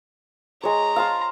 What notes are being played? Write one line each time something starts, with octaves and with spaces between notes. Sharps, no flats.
G#3 C#5 A#5
F5 A5 C6